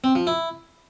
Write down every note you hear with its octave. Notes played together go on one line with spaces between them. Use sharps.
C4
F3
E4